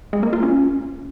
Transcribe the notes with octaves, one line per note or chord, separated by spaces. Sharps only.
G#3
A#3
F4
C#4